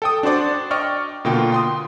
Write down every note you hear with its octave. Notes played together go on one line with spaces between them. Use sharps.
A4 G5 D#6
D4 F#4 C5 D5
D5 D#5 G5 C#6 F6
B2 D3 A#3 F4 G5
G5 C6 D#6